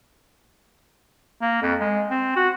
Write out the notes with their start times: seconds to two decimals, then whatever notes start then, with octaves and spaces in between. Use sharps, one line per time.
1.42 A#3
1.62 F2
1.80 G#3
2.10 C4
2.36 F#4